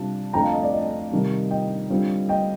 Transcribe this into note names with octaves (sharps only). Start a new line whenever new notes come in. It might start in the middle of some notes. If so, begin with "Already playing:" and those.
Already playing: C3 G3 D4 F4 A5
F2 D3 A3 D4 F4 G5 A#5
F5 A5
D#5
D5
D#5
C3 D#3 G3
D#5 G5
D3 G3 C4 F4
D#5 G5